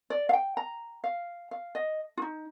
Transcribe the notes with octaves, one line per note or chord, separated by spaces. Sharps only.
D5
F5
G5
A#5
F5
F5
D#5
F4
D#4